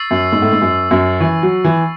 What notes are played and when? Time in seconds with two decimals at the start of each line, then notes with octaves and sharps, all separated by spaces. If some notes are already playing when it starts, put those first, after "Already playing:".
Already playing: C#6 E6 A6 C7
0.11 F#2
0.32 G#2
0.42 A2
0.52 G#2
0.61 F#2
0.91 F#2
1.20 E3 C#6 E6 C7
1.43 F#3
1.64 E3